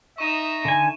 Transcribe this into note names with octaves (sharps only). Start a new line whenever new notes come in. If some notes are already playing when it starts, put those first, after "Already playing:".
D#4 D#5 E5 C#6 D#7 E7
D3 G#5